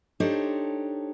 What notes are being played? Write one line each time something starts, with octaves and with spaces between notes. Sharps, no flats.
D4 D#4 G4 A4 C5 C#5